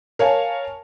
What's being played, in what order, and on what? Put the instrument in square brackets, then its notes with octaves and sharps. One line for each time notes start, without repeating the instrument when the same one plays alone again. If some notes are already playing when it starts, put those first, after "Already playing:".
[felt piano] A#4 C#5 F5 G#5 A5